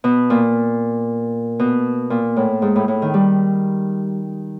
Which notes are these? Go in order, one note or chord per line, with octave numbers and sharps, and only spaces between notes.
B2
A#2
B2
A#2
A2
G#2
A2
A2
D#3
G3